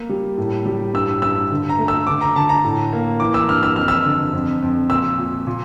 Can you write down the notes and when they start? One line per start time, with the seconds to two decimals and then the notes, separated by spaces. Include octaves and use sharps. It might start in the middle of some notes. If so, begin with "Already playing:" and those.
Already playing: A#3
0.09 G3
0.38 A2
0.66 G3
0.94 G2 E6
1.22 G2 E6
1.51 D3
1.69 A#5
1.78 A3
1.88 E6
2.07 D3 D6
2.21 A#5
2.36 D3 A5
2.49 A#5
2.64 A2
2.93 A#3
3.20 E3 D6
3.34 E6
3.48 G2 F6
3.63 E6
3.76 F2 F6
3.88 E6
4.05 D3
4.33 F2
4.62 F2
4.90 A#2 E6
5.18 A#2
5.47 A#2